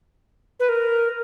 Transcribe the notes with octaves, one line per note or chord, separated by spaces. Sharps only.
B4
A#4